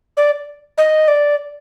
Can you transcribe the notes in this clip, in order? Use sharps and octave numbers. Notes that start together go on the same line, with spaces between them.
D5
D#5
D5